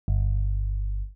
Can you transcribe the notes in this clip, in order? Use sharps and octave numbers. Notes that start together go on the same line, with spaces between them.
G1